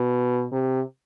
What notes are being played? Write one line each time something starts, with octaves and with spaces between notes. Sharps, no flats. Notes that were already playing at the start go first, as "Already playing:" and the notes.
Already playing: B2
C3